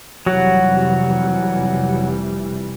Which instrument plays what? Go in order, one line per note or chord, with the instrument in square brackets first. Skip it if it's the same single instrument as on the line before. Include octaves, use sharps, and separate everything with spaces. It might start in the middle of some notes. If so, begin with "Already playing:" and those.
[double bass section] F1 E3 G3 [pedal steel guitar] F#3 F#4